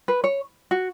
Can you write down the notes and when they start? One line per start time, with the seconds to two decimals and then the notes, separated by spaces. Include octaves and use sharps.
0.08 B4
0.24 C#5
0.71 F#4